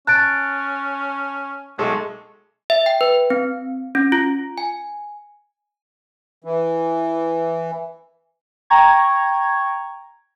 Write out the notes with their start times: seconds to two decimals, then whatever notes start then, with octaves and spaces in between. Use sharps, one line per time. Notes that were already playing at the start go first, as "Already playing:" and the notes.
0.07 C#4 A5 F#6 A6 D7
1.78 B1 G#3 A3 A4
2.70 E5
2.86 G5
3.01 B4
3.30 C4
3.95 C#4
4.12 F4
4.58 G#5
6.44 E3
8.70 G5 A#5 C#6 G#6